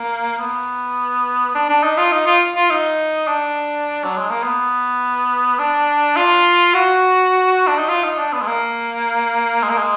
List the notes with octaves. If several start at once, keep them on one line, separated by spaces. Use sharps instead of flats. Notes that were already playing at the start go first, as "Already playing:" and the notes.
Already playing: A#3
B3
D4
D4
D#4
F4
D#4
F4
F4
D#4
D4
F#3
G#3
A#3
B3
D4
F4
F#4
D4
D#4
F4
D#4
D4
B3
G#3
A#3
G#3
A#3
G#3